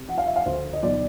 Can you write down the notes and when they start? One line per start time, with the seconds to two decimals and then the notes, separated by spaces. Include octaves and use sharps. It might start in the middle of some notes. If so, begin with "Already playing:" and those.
Already playing: C3
0.09 F3 F#5
0.18 F5
0.27 E5
0.36 F5
0.45 D2 C5
0.73 D#5
0.83 B1 D5